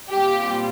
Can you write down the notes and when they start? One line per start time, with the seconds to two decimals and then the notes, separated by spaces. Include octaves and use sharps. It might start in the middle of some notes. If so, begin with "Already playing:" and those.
0.12 A#2 G3 C4 F4 G4